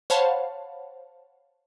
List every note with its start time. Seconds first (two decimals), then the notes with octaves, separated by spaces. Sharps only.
0.10 C5 C#5 F5 F#5 A5 B5